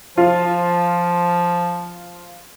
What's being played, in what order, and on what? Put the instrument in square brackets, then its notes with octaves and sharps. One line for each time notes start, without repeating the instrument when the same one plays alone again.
[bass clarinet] F3 [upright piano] F4